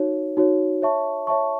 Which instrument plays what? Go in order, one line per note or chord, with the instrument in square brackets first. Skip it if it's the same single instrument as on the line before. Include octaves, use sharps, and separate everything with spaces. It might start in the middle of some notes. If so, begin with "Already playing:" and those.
Already playing: [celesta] D#4 F#4 C#5
D#4 F#4 C#5
C#5 E5 A5 C#6
C#5 E5 A5 C#6